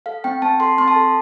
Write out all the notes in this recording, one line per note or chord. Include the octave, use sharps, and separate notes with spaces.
A4 F5
C4 G5
C4 A5
A4 C6
C4 C6
A5
A4